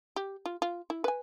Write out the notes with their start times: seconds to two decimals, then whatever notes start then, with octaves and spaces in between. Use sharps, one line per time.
0.16 G4
0.46 F4
0.62 F4
0.90 E4
1.04 B4 G#5